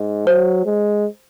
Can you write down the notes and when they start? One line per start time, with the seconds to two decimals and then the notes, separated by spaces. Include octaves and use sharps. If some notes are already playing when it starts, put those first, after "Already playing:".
Already playing: G#2
0.27 F#3 C5
0.65 G#3